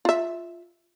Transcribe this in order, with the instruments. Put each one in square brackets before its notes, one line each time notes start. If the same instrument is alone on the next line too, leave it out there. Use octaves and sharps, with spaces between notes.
[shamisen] F4 E5